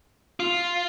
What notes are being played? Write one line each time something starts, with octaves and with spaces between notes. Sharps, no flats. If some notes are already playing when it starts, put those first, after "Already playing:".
F4